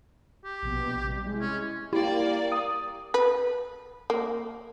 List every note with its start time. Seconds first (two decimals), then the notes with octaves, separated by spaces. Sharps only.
0.44 G4
0.62 A#1 B2 B3
1.04 C3 G3
1.25 G#3 E4
1.41 C#4
1.93 A#3 E4 G4 D5
2.52 D#6
3.14 B4
4.10 A#3